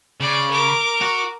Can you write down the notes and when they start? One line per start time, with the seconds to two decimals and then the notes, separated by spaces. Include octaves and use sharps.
0.21 C#3 D5
0.51 A#4 D6
1.02 F#4